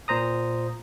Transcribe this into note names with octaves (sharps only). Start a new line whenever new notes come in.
A#2 C5 A#5 D#6